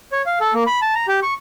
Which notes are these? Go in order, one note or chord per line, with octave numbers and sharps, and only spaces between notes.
C#5
F5
A4
A#3
B5
A5
A#5
G4
C#6